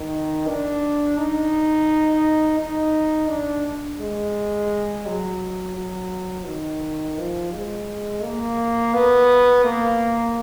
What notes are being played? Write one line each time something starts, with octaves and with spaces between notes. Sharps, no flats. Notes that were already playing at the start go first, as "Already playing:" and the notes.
Already playing: D#3
D4
D#4
D#4
D4
G#3
F#3
F#3
D#3
F3
G#3
A#3
B3
A#3